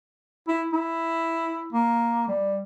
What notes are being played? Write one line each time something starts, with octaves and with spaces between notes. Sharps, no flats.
E4
E4
A#3
G3